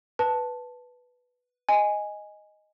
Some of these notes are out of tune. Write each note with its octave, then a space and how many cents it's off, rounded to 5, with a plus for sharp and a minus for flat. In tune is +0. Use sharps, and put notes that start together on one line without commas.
B4 +0 A5 +0
D#5 +0 G#5 -5